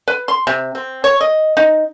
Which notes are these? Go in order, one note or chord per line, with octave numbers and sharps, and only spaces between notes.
B4
C6
C3
C4
C#5
D#5
D#4